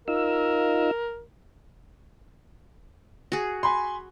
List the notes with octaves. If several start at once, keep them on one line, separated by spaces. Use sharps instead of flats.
D#4 F4 A#4 E6
F#4 G#4
G#5 B5 C6